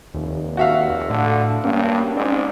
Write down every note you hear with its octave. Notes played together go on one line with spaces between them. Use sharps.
F1 D#2
F#4 E5 F5
A2 D3
G2 A#3 C#4
G#2 C4 D5